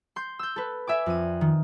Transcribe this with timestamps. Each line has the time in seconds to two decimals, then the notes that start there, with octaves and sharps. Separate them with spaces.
0.16 C6 G6
0.39 E6 G6
0.56 A4 B4
0.87 D5 E5 G#5 D6
1.06 F2 D#7
1.41 D#3